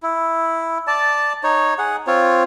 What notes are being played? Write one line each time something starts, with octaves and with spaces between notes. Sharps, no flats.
E4
D5 A5
D#4 C#5
G#4 F#5
C4 F4 C#5